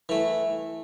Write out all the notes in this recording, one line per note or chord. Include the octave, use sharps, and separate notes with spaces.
E3 A3